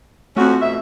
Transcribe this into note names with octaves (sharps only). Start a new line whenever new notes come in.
F2 A3 C4 C#4 F#4
F2 B2 E5